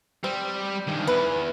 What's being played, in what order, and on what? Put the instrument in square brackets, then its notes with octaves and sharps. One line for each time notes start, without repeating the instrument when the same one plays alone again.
[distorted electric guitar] G3 [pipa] C4
[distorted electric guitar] G2 D#3
[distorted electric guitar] E2 [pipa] B4